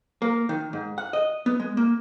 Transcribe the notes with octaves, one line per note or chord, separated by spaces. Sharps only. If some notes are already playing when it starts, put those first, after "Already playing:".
A#3
D#3
G#2
F#5
D#5
B3
G#3
A#3